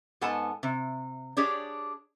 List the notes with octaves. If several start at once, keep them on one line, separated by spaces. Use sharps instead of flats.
G#2 B3 A4 F#5 G#5 A5
C3
D4 G4 G#4 C#5 D5